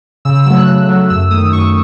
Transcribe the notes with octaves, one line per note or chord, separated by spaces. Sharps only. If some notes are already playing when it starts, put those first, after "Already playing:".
C#3 E6
E6
F#3 A3 E6
F#6
C#3
F#3 A3
F#2 E6
D#3 A3 D#6
F#2 C#6